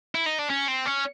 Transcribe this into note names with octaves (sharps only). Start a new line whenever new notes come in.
E4
D#4
D4
C#4
C4
C#4